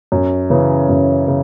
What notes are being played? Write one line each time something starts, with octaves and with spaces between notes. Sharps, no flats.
F#2
C#3 E3
F#2
C#3